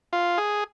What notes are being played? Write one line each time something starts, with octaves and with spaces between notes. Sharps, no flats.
F4
G#4